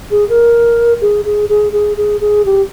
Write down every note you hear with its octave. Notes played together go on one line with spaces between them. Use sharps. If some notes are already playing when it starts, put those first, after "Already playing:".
G#4
A#4
G#4
G#4
G#4
G#4
G#4
G#4
G4